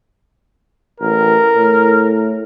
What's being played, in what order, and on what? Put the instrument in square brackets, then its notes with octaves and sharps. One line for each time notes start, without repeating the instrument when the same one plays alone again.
[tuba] A1 [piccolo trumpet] A#4
[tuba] A2